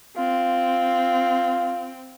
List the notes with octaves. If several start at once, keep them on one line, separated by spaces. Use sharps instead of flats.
C4 F4